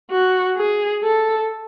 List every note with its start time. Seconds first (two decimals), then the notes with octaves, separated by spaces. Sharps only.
0.11 F#4
0.57 G#4
1.03 A4